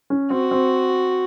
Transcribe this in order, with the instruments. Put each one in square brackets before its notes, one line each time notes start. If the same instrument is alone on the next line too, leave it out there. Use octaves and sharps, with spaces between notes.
[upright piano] C#4
[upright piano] C4 [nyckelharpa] F#4
[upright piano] C4